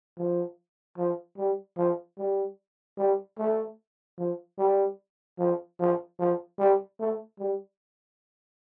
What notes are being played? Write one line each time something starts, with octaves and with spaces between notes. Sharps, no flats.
F3
F3
G3
F3
G3
G3
A3
F3
G3
F3
F3
F3
G3
A3
G3